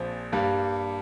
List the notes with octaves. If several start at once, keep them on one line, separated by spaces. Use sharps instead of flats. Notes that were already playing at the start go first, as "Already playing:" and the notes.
Already playing: A#1 A#2 F3 C4
G2 G3 A#3